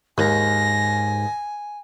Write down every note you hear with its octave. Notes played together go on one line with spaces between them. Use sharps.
D#2 G#2 G#5 A#6